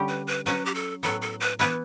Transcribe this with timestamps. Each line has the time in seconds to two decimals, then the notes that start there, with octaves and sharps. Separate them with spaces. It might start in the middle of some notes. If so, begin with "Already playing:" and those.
Already playing: D3 G3 C#4 G4
0.08 B4
0.27 B4
0.46 F#3 C#4 F#4 B4
0.65 G4
0.75 A4
1.03 A2 F#3 B3 A4
1.22 A4
1.40 B4
1.59 E3 B3 E4 B4